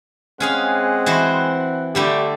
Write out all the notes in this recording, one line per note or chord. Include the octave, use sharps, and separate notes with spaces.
G#3 C4 C#4 G#4 F5 F#5
E3 F#4 C5
D3 G3 A3 G4